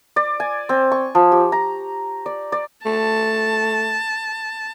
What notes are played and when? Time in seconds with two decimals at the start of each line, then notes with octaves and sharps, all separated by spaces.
0.16 D5
0.40 G#5
0.69 C4
0.92 C#6
1.15 F3
1.32 G4
1.52 A#5
2.26 D5
2.52 D5
2.86 A3 A5